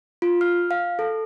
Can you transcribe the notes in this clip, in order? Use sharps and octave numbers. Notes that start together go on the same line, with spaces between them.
F4
F6
F5
A4